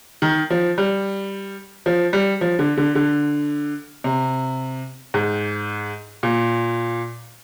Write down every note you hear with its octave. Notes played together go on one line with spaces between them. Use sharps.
D#3
F3
G3
F3
G3
F3
D3
D3
D3
C3
G#2
A#2